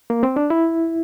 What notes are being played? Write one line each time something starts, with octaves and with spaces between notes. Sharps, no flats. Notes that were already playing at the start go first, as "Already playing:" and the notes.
A#3
C4
D4
E4